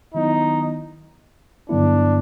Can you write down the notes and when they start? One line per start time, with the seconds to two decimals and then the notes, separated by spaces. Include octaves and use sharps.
0.14 D#3 F#3 B3 D#4 E4
1.69 G2 D3 F#3 B3 D4 E4